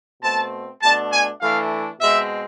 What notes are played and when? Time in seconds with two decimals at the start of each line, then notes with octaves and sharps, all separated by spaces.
0.23 B2 A3 C4 A5
0.82 B2 A3 D4 A5
1.12 G#5
1.41 E3 A3 D4 F5
2.01 B2 G#3 C4 E5